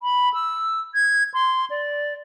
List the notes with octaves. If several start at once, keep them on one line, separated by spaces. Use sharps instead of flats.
B5
E6
G#6
C6
D5